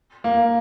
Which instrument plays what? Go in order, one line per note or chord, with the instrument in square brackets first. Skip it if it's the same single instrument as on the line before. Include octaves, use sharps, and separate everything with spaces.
[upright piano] A#3